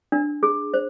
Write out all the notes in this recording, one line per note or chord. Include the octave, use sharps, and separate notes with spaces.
D4
G#4
C5